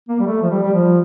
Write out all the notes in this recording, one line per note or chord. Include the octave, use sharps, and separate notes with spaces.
A#3
G3
A3
F3
G3
G3
F3